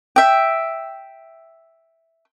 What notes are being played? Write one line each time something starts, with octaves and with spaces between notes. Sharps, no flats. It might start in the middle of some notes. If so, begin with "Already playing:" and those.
E5 G5